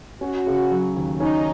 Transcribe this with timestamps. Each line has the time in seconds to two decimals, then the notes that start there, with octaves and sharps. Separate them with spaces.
0.21 C#4 F#4
0.47 C#3
0.71 F#3
0.96 D#2
1.20 C#4 D#4